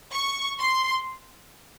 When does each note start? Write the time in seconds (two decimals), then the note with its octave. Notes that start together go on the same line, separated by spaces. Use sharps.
0.13 C#6
0.59 C6